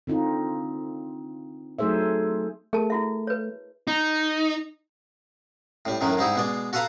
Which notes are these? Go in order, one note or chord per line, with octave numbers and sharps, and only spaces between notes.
D3 C4 D#4 F4
F#3 A3 D#4 G#4 C5 E5
A3 G#4 A#4 A5
E4 F#4 E5
B4 C#5
D#4
A2 G3
F#2 A2 D#3 F#3
G#2 G3 D#4 E4
B2 G#3 D5
F#4 A4 B4 F5 A#5